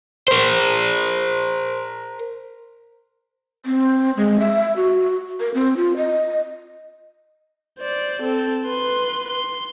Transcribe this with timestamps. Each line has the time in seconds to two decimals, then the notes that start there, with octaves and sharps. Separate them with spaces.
0.28 A#4 C5
3.66 C4
4.17 G#3
4.40 E5
4.76 F#4
5.40 A#4
5.54 C4
5.77 F4
5.97 D#5
7.79 C5 D5
8.22 C4 A4
8.64 B4 C6
9.30 C6